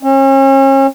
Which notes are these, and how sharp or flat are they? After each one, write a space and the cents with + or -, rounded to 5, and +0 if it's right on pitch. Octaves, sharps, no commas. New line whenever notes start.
C#4 -40